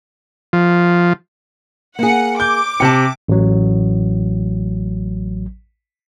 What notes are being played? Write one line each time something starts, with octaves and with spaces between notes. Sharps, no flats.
F3
A#3 G#4 F#5
D6 G6
C3 G5 A5 C#7
A1 F#3